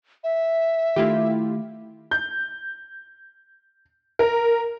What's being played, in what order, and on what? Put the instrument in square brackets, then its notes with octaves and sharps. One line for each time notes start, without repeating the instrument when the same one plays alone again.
[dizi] E5
[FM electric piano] D#3 A3 [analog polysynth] E4 F4 G4
[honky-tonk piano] G6
A#4